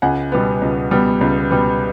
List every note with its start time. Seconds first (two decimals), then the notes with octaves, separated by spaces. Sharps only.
0.02 C#2 F#5 G#5
0.32 B2 G3 B3
0.62 C#2
0.91 B2 G3 B3
1.21 C#2
1.51 B2 G3 B3